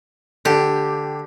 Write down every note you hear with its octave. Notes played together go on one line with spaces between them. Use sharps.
D3 G4